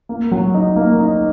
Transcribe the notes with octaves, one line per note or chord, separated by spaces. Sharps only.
A#3
F#3
D#4
A#3
D#4